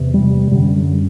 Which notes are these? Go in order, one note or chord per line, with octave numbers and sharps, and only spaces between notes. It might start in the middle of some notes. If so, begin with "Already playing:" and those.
Already playing: E2 C3
G3
F#2 D3 G3